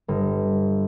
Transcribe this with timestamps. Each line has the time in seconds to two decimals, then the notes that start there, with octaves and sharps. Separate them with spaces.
0.08 G1